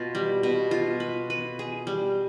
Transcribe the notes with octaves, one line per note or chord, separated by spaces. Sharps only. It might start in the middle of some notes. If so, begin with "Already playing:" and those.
Already playing: B2 F4
G3
B2
F4
B4
B4
G#4
G3